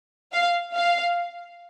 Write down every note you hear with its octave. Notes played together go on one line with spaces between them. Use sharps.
F5
F5